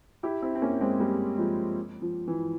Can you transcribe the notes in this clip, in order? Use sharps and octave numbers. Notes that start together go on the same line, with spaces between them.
E4 G4
C4 E4
C4
A#3 C#4
G#3 C4
G3 A#3
F3 G#3
F3
E3